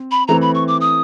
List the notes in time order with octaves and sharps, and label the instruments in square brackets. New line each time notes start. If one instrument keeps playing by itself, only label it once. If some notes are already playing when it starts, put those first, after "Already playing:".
Already playing: [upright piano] C4
[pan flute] B5
[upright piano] E3 A3 C4 [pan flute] A#5
[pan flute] B5
C#6
D6
D#6